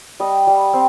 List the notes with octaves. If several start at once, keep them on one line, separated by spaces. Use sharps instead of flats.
G3 D#5
G3
C4